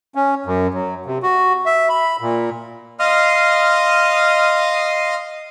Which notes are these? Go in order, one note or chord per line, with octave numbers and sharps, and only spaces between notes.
C#4
F#2
F#3
C3
F#4
E5
B5
A#2
D#5 F5 C6 D#6 F6